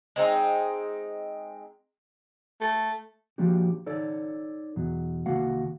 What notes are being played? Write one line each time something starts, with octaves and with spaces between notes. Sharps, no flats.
G#3 C4 D#4
A3
F3 A#3 D4 F#4 G4
D#4 A4 C#5 D5
E2 B2 F#3
C2 D#3 A#3 F#4 F5 F#5